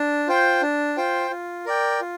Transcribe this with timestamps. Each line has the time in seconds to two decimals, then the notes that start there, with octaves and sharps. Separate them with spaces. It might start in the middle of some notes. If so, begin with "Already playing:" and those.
Already playing: D4
0.28 F4 C5 G5
0.62 D4
0.97 F4 C5 G5
1.31 F4
1.66 A#4 D5 G5
2.01 F4